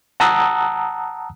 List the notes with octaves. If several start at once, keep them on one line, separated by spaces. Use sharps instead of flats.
F#5 A5 A#5 D#6 E6 F#6